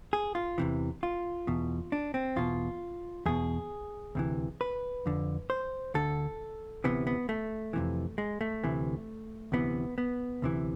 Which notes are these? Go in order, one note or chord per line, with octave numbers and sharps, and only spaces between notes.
G#4
F4
E2 C3 E3
F4
E2 B2
D4
C4
E2 B2 F4
E2 B2 G#4
D2 C3 E3
B4
F2 D3
C5
D2 D3 A4
D2 C3 E3 B3
B3
A3
F2 C3 E3
G#3
A3
D2 C3 E3
D2 C3 E3 B3
B3
D2 C3 E3